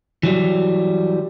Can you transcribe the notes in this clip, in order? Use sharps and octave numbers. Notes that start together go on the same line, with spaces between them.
E3 F#3 G3